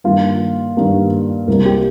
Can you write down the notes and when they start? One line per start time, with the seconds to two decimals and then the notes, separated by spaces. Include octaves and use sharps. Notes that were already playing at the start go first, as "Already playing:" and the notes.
0.04 G2 D#3 G3 A#3 F4
0.77 G2 D#3 G3 A#3
1.48 C2 C3 G3 A#3 A#4
1.66 G4